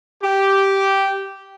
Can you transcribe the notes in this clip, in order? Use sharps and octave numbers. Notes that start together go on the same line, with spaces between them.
G4